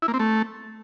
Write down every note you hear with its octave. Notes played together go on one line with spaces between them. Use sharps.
E4
A#3
C4
A3